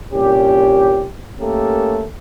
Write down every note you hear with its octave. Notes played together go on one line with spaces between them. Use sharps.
C2 A#2 C#4 G4
A3 A#3 C#4 G4 A4 A#4